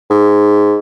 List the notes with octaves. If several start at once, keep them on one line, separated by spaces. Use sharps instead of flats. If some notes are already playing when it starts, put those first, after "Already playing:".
G#2